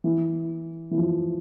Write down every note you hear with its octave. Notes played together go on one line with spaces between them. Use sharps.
E3
E3
F3